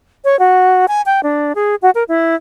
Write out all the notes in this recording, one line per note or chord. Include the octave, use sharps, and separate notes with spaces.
C#5
F#4
G#5
G5
D4
G#4
F#4
A#4
E4